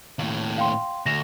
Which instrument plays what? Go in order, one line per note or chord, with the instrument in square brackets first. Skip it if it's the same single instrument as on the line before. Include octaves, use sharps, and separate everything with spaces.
[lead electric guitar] D#2 A2
[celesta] F5 G5 C6
[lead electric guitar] D2 [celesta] A#6 E7 F7